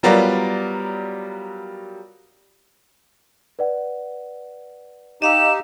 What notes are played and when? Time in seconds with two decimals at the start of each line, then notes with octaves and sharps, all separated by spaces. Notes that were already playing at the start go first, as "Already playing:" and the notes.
0.03 F#3 G3 B3 F4 A#4 D5
3.59 B4 D5 F#5
5.22 D#4 G4 D#5 F5 E6 E7